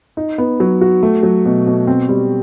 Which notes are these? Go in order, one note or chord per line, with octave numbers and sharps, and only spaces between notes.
D#4
B3
F#3
F#4
A3
F#3
B2
B2
C4
G3